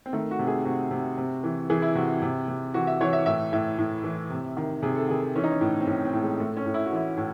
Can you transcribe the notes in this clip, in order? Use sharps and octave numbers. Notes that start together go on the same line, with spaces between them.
C4
D#3 A3
F#4
C3
G#4
C3 F#4
C3
C3
E3
E3 G#4
E4
C3 F#4
C3
C3
E3 F#4
E5
E3 C#5
E5
A2 E5
A2 E5
A2
E3
C3
D#3
C3 G#4
A4
D#3 G#4
E3 C#4
D#4
C#4
A2
C4
A2 C#4
C4
A2
G#3
A2 A3
C#4
A2
E4
F#4
E3 E4
A2